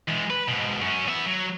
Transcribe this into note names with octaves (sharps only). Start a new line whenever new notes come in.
E2 G#3
B4
G#2 B2
F#2 C#4
B3 E5
F#3